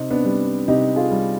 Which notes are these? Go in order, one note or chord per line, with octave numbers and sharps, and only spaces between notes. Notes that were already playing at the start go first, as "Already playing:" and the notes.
Already playing: C3 C4 D#4
B3 D4
G3
C3 D#4 G4
F4 G#4
G3